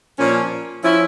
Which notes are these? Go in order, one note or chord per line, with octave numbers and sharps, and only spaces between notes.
A#2 F3 C#4
F3 C#4 E4